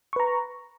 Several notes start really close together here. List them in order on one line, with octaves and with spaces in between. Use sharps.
C#6 B4 A#5